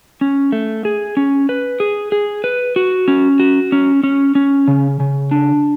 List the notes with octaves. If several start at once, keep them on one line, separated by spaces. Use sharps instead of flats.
C#4
A3
G#4
C#4
B4
G#4
G#4
B4
F#4
C#4
F#4
C#4
C#4
C#4
C#3
C#3
D4